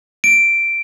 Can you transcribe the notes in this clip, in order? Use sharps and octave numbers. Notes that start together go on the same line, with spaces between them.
D7